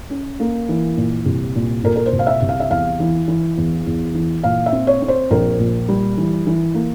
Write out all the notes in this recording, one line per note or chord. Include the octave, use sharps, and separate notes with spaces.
C#4
A#3
E3
A#2
C2
A#2
A#2 A#4
A#4
C5
C2
F5
E5
C2
F5
E5
E2 F5
E3
E3
E2
E2
E3
A#2 F5
E5
C4
C#5
C4
C5
A#1 A#4
A#2
G3
E3
E3
A#3